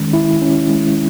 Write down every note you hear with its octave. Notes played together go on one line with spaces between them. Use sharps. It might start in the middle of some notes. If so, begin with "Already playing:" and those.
Already playing: D#3 G#3 C#4
E4
C#4
G#3